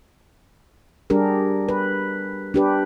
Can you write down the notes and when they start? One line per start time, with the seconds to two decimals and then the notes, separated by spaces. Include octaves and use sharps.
1.10 G3 D4 G4 G#4 A#4
1.69 B4
2.54 D4 G4 B4